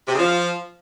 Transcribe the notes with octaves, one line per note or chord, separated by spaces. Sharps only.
C3
C#3
F3